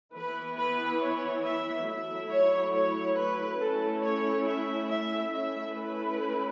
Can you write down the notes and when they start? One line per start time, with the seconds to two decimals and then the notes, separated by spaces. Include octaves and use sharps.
0.14 E3 B3 E4 B4
0.58 B4
1.01 C#5
1.43 E5
1.87 F#3 A3 E4 E5
2.29 C#5
2.73 C#5
3.16 B4
3.59 A3 C#4 E4 A4
4.02 C#5
4.45 E5
4.87 E5
5.30 A3 C#4 E4 E5
5.74 B4